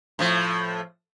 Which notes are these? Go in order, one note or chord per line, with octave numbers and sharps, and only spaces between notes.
A2 F3